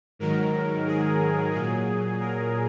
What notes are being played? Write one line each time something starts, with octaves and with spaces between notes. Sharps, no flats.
G#2 D#3 F#3 A#4
G#4
A#2 F#3 G#4
A#4